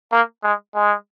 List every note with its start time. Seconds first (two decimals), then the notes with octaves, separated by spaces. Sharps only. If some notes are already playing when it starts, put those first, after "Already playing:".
0.12 A#3
0.43 G#3
0.75 G#3